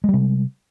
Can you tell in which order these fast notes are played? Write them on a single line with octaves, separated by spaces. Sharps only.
G#3 G3 C3